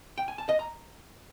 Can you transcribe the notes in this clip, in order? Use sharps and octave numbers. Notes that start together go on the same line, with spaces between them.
G5
G#5
A5
D#5
A#5